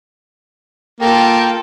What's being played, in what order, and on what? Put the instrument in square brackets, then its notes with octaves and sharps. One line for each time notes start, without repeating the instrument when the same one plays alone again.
[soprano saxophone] A#3 [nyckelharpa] F4 A4 [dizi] G5